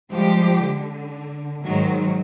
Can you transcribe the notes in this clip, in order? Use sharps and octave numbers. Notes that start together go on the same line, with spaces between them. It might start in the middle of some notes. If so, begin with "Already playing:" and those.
F3 G3 G#3 G4
D3
G#2 D#3 F#3 G#3